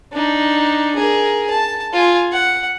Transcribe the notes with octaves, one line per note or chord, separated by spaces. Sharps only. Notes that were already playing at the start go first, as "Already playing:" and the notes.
D4 D#4
G#4 A#4
A5
F4 G#5
F#5